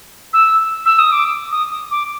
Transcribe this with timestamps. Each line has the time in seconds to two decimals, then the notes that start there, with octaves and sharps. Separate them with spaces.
0.33 E6
0.86 E6
0.99 D#6
1.12 D6
1.52 D#6
1.91 D6